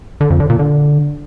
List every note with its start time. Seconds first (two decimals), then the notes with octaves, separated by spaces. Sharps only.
0.21 D3
0.30 F2
0.40 D3
0.50 A#2
0.59 D3